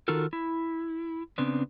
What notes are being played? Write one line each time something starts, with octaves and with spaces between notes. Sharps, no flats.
D#3 D#4 F4 F#4 A4 A#4
E4
C#3 B3 C4 D4